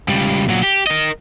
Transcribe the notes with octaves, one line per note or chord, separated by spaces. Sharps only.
C#2 G3
A#2 F#3
G4
A#4 D#5